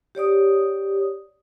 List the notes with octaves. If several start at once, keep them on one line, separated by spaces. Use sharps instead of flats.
G4 C#5 D5 D#6